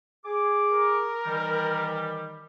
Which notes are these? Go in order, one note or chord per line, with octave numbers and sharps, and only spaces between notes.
G#4 D6
A#4
D#3 E3 G3